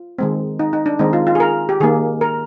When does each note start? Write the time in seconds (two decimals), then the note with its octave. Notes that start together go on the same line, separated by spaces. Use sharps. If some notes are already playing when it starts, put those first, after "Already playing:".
Already playing: F4
0.19 D#3 G#3 C4
0.59 D#4
0.73 D#4
0.86 D4
0.99 D#3 G#3 C4 D#4
1.13 F4
1.27 F4
1.35 G#4
1.40 A#4
1.69 G4
1.80 D#3 A#3 G#4
2.21 A#4